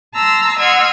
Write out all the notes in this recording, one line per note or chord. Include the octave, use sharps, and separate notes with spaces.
A5 A#5 C6 E6
D#5 F#5 C6 E6 F6 G#6